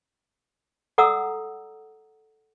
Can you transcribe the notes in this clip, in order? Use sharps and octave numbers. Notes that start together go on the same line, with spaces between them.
A4 D5 F#5 A#5 D#6 E6